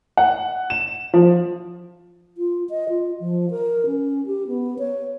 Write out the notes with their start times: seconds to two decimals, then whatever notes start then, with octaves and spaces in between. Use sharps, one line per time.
0.17 F#5
0.70 E7
1.14 F3
2.38 F4
2.70 D#5
2.89 F4
3.20 F3
3.51 A#4
3.86 C#4
4.26 G4
4.47 B3
4.79 C#5